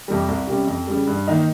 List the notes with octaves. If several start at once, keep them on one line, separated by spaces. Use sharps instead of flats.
F2 C3 G3
C2
C3 G3 C#4
F2
C#3 G3
G2
D#3 A#3 D#4